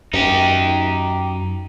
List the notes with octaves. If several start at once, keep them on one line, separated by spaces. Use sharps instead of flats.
F#2 D#4 G4